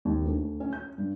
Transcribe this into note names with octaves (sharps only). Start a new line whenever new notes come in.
D#2
D2
C#4
G6
G2